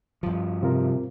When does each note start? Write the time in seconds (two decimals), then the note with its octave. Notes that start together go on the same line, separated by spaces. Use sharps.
0.23 G2 F3
0.63 C3 C4 F4 A#4